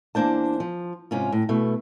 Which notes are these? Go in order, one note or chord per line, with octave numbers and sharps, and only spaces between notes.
E2 A#3 D4 C5 A5
F3
G#2 C3 C#4 F4
A2
B2 A3